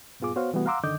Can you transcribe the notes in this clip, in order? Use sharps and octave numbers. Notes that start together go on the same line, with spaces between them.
G2 A#2 B3 F4 G#4 D6
B3 F#4 C5 C#5 F5
C3 E3 G3 A3 B3 F#4
F5 F#5 A#5 C6 D6 E6
F#2 D3 D#3 D#5 D6 G6